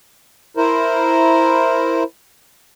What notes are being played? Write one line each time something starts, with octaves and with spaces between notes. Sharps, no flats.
E4 A#4 C5